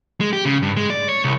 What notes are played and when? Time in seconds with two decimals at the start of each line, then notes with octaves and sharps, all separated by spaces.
0.21 G#3
0.33 G4
0.45 C#3
0.62 G2
0.77 G#3
0.90 D5
1.09 C#5
1.24 C2